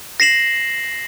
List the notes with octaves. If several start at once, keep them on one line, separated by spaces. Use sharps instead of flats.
A#6 C7 E7 F#7